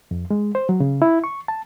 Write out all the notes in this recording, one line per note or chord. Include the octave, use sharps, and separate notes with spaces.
F2
G#3
C5
F#3
C#3
E4
C#6
A5